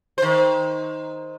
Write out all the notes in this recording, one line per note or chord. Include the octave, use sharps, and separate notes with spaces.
D#3 C5